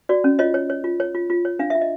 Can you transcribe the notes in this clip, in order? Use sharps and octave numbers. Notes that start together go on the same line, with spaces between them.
F#4 D5
C#4
F4 C#5 D#5
C#5
C#5
F4
C#5
F4
F4
C#5
D4 F5
F4 E5
D#5